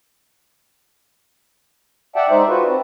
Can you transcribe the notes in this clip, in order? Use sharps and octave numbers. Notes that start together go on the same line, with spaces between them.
D5 E5 F#5 G5 A5
G#3 D#4 C5 D5 E5
F4 F#4 B4
C4